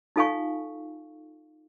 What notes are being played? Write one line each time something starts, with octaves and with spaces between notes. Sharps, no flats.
D#4 F4 A4 F5 G#5 C#6